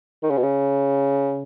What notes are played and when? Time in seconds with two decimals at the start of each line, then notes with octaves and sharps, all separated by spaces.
0.23 D#3
0.30 C#3
0.37 B2
0.43 C#3